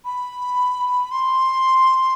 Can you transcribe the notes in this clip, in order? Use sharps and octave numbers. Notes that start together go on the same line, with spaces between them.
B5
C6